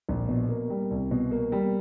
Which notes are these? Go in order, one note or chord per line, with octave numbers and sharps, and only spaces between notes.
A#1
B2
A#3
G3
C2
B2
A#3
G3